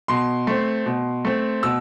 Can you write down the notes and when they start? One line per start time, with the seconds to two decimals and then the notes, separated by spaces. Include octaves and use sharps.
0.08 B2 C6
0.47 A3 C4
0.86 B2
1.25 A3 C4
1.63 B2 E6